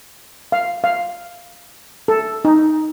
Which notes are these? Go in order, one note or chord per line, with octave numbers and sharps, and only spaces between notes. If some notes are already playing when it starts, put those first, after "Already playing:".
F5
F5
A4
D#4